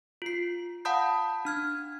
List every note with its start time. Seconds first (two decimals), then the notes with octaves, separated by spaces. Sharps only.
0.22 F4 C7
0.85 F5 F#5 A5 B5 D#6 G6
1.45 D4 F6 G#6